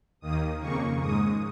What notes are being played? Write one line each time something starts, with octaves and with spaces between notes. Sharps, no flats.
D#2 D#3 A#3 D#6
F2 C#3 A#3 C#6
G#2 G#3 D#6